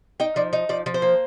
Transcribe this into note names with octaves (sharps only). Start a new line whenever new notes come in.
D#4 G5
F3 D5
D#4
F3 D5
F3
C5
A#3